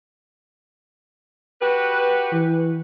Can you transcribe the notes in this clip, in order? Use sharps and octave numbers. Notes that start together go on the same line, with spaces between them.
F#4 G4 B4
E3